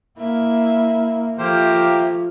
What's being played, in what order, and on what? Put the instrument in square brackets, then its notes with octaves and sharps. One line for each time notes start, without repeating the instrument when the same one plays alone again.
[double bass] A#3 [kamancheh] E4 E5
[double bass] F3 [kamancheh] A3 E5 [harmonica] A#3 G4 C5